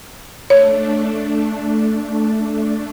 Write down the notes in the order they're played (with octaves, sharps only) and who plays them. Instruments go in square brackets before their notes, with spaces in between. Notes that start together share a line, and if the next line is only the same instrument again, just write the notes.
[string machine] A3 D4 [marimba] C#5